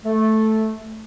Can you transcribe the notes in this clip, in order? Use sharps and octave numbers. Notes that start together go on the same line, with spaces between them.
A3